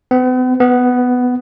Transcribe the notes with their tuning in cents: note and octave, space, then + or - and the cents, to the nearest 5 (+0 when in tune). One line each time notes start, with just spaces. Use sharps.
B3 +45
B3 +10